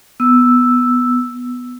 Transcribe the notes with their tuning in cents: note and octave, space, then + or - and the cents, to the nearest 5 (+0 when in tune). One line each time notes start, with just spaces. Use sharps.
B3 +0 E6 +0